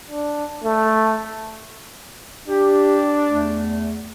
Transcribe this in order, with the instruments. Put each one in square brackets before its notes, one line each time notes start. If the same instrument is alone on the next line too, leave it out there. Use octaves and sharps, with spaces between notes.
[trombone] D4
A3
[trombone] D4 [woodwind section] G4
[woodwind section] E2 A3